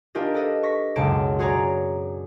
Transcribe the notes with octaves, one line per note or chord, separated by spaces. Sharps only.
D4 F4 G4 A#4 D#5
A4 B4 D#5
C#6 A#6 B6
C#2 F#2 B2 A5 D7
F#4 G#4 C#5 D5 A#5